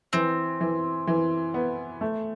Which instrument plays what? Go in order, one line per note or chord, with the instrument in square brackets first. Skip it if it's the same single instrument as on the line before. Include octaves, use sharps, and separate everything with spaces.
[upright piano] E3 [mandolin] C4
[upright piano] E3
E3
B3
A3